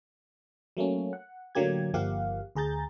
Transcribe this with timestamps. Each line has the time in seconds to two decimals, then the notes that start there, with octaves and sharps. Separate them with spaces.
0.77 F#3 A3 A#3 C#4
1.13 F#5
1.55 A2 D3 F#3 A#3 G4 G#6
1.94 G1 F3 A#3 G4 F5 F#5
2.55 D2 G#4 A#5 G6 A6